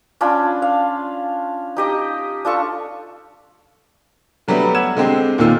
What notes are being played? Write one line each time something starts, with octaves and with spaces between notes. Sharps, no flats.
C#4 D4 F4 B5
F5
D#4 G4 D#5
D4 F4 A4 C#6
D3 F#3 G3 A3 B3
F#5 E6 G#6 E7
D3 G#3 C4 G4
D#2 A#2 D#3 F4 E6